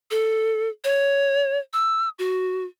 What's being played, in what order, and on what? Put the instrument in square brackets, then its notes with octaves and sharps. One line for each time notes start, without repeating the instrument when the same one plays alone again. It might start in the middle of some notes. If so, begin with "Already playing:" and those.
[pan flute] A4
C#5
E6
F#4